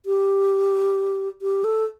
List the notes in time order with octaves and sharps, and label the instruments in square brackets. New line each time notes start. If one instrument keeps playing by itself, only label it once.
[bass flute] G4
G4
A4